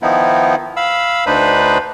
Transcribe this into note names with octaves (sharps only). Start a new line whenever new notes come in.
D#3 F3 B3 D#4 E4
F5 B5 E6
D2 D4 D#4 B4 C5 B5